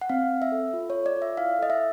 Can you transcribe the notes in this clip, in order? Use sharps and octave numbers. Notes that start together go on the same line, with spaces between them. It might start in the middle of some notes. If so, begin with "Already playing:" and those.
F#5
C4 F5
C4
E5
A4
F4
C#5
A4
D5
F4
E5
E4 F5
A4 D#5
E5